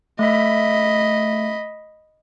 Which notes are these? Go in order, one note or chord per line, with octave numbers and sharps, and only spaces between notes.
A3 D#5 E5 B5